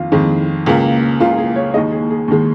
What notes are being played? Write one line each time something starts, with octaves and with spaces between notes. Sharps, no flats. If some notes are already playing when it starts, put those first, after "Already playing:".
Already playing: F2 D#3 F4
F2 D#3 G#3
C#2 C#3 A#3
C#2 C#3 A#3 F4
G#4
C#5
D#2 D#3 G#3 D#5
G#4
G#4
D#2 D#3 G#3